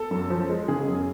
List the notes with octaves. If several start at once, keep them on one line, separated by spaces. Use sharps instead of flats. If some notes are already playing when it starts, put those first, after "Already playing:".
Already playing: A4
F#2
F3
G#3
C#3 G#4
F#2